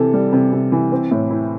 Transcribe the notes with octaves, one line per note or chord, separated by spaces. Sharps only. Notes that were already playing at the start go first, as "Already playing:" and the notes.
Already playing: C3 E3 A4
G3
C3
C3
E3
C4
A2
E4